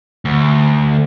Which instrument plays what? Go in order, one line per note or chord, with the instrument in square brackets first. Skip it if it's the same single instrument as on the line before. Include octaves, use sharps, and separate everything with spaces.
[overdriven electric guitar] D2